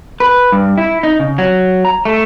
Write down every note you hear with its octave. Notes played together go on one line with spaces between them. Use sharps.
B4
G2
E4
D#4
C#3
F#3
A#5
A3